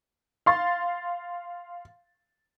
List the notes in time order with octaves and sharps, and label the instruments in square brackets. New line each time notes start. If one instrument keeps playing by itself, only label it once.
[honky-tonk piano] F5 C6 A6